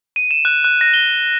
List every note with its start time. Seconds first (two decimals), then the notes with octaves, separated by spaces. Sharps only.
0.16 D#7
0.31 E7
0.45 F#6
0.64 F#6
0.81 A#6
0.94 G7